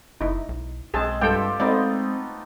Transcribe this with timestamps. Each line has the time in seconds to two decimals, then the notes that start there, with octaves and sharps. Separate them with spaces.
0.21 F#1 D#4 E4
0.49 B1
0.94 B1 G#3 C4 G#4 A5
1.21 G2 F4 G4 A4 C5 G5
1.60 G#3 A3 B3 C4 D#4 D5 F5